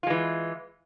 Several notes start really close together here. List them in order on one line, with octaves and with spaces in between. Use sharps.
F4 G#3 E3